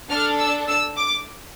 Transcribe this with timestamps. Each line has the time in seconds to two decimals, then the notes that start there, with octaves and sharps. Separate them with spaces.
0.11 D4 A4 F6
0.39 E6
0.69 E6
0.97 D6